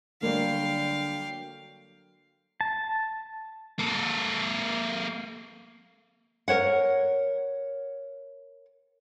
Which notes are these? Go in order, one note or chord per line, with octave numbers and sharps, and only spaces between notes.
D3 F#3 G3 A#3 F5 G5
A5
A#3 A4
A#4 C5 C#5 F#5